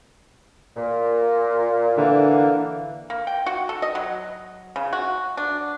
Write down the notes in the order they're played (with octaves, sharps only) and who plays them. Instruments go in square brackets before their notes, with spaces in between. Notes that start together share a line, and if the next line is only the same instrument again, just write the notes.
[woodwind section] A#2
[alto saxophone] D3 [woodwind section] E3 A#3
[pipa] A#3
G5
F#4
A4
D#5
F#3
C#3
F#4
D4